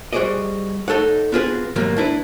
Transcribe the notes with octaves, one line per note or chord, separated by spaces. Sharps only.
G3 F#4 G#4 C5 D5 D#5
D#4 A4 C#5 F#5
B3 C4 F4 F#4 G#4 B4
G#2 B2 D#3 F#3 G3 A#3
D4 E4 A4 B4